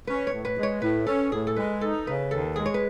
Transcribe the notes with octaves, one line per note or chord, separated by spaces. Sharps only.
C#4 B4
C#5
A2
B4
G#3
C#5
A2 B4
C#4 A4
A2 G#4
A4
G#3 B4
D#4 A4
C#3 B4
D#2 A4
G#3 G#4
C#5
B4